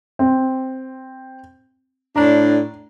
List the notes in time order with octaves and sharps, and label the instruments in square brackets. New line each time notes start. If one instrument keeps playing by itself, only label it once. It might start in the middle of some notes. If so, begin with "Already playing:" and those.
[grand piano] C4
[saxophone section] A2 D4 [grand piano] A#5